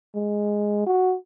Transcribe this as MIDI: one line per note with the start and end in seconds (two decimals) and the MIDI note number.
0.15 0.82 56
0.87 1.15 66